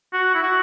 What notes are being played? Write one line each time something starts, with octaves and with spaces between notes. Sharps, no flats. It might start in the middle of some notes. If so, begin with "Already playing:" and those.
F#4
E4
F#4